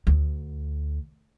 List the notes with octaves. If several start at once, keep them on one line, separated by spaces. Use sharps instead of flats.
D2